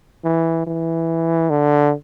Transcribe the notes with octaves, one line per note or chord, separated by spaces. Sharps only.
E3
E3
D3